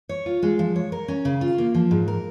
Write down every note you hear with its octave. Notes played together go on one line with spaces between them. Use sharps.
C#5
F4
G#3
F3
C#5
A#4
C#4
C#3
F4
A#3
F3
G#2
A#4